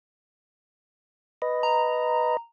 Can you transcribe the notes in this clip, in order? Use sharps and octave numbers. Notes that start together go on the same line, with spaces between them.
B4 D#5
A#5